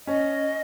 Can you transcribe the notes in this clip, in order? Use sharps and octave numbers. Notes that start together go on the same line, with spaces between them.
C#4 D#5